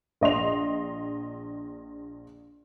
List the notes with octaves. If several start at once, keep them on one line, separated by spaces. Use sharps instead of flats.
A#1 D#5 C6 F7